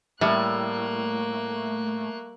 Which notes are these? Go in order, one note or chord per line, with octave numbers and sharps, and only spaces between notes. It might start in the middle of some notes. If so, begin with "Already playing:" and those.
A2 G3 A3 A#3 F#6